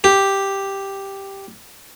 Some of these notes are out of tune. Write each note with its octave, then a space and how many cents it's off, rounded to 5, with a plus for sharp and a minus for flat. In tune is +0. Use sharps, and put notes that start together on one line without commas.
G4 +0